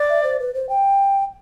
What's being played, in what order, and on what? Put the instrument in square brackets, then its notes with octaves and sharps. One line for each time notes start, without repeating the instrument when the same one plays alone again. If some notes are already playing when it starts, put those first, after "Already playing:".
Already playing: [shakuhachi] D5
[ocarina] E5
C5
B4
C5
G5